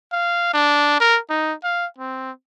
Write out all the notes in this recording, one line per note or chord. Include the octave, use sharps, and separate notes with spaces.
F5
D4
A#4
D#4
F5
C4